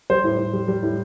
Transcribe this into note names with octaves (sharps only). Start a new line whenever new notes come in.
G3 C5
A2
A2
G3
G3
A2